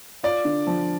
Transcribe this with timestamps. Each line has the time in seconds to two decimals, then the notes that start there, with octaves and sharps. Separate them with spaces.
0.23 F4 D5
0.45 D3
0.67 F3